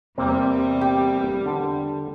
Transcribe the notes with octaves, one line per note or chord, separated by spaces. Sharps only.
E2 C3 G3 A#3 C4
G4
D3